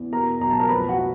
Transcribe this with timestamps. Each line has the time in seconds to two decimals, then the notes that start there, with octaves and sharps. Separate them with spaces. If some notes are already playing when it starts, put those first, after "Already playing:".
Already playing: E2
0.12 B2 A#4 A#5
0.41 B1 A#5
0.50 A5
0.60 A#4 A#5
0.69 F2 B4 B5
0.88 F#4 F#5
0.98 F#3